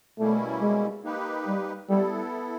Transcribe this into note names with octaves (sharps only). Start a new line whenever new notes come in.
B2 G3 A3 A#3 C#4 E4
G#3
A#3 D#4 G4 B4
G3
G3 B3 E4 A4